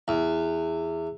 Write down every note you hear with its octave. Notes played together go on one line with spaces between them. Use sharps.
E2